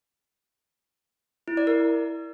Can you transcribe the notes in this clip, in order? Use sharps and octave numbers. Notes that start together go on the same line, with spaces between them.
E4
D5
A#4